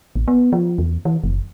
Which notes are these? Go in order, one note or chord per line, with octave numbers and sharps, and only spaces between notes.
A1
B3
F3
E2
E3
F#1